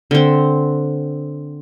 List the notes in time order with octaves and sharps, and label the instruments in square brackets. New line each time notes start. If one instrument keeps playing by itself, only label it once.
[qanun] D3 C4